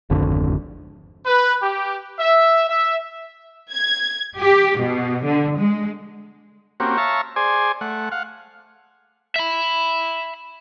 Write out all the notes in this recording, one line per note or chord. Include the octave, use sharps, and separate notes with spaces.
D1 G#1 F2 D3
B4
G4
E5
E5
G#6
G4
B2
D3
G#3
A#3 C4 C#4 F#4 G4
C#5 E5 F5 A5 A#5 C#6
G#4 C5 D5 G#5
A3 F#5
F5 F#5
E5 B5